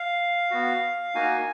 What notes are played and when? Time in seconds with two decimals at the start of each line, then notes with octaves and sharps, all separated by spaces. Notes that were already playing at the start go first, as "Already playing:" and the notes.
Already playing: F5
0.51 B3 F#4
1.15 A#3 D#4 F#4 G#5